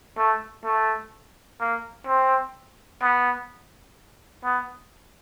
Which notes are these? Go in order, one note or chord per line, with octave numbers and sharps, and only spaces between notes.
A3
A3
A#3
C4
B3
B3